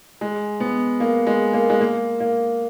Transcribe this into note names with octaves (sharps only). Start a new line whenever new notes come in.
G#3
B3
A#3
G#3
A#3
G#3
A#3
A#3